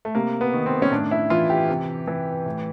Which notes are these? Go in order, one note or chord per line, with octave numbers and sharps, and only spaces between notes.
A3
C3 A#3
B3
D#3
C4
C#4
A2 D4
E4
E3 F4
G4
C3
E3
A2